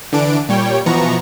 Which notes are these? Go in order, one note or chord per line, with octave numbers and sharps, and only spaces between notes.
D3 E3 D4 D7
A#2 G3 C#5 G5
B2 E3 F3 B3 A#5 C#6